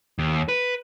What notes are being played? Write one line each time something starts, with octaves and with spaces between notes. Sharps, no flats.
D#2
B4